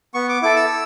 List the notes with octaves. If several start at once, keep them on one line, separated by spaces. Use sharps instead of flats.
B3 C#6
D6
E4 A4 D6
E6